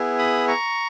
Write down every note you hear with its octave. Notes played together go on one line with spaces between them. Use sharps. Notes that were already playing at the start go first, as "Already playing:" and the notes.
Already playing: B3 E4 G#4
B5 D#6
A#5 C#6